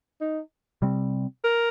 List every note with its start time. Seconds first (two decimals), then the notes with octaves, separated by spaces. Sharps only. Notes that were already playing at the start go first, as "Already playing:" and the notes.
0.21 D#4
0.82 C3 G3 C4
1.44 A#4